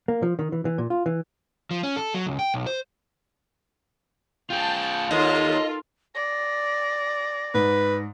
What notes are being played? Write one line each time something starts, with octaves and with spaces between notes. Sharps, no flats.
A#3
F3
D#3
E3
E3
A#2
F4
E3
F3
C#4
A4
F#3
C#2
G5
B1
C5
F4 G#4 G5 A5
D#2 F4 A4 A#4 D#5
D5 A#6
G#2 B4